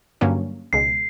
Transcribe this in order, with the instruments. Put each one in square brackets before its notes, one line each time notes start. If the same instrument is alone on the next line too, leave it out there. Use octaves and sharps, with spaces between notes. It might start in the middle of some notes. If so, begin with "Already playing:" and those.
[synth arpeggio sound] G2 D3 F#3 A#3 C#4
[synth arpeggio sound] C#2 B2 G#3 [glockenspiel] C7